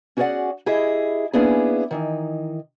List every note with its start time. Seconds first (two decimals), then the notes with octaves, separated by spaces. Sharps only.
0.17 C#4 F#4 G#4 C#5 D5 F#5
0.66 E4 G4 G#4 D#5 E5
1.33 A#3 B3 C#4 D4 E4 G#4
1.91 D#3 E3 D#4